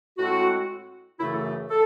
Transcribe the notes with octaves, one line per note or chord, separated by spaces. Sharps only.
A2 G#3 C4 F#4
F#2 C#3 E3 A3 E4
A4
A4